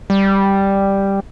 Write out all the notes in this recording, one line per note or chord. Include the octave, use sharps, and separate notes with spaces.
G3